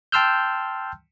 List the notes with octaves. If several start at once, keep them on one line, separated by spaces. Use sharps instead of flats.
G5 A5 C6 E6 F6 G6